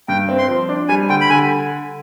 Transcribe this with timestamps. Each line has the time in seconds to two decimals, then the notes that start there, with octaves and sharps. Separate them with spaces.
0.08 G2 G5
0.29 C4
0.38 C6
0.48 F3
0.69 D4
0.89 G3 G#5
1.09 D3 G5
1.21 B5
1.30 D3 G#5